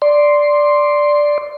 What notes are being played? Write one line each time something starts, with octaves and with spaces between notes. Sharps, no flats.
D5 C6